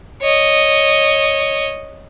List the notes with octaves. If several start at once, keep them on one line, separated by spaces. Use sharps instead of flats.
C#5 D#5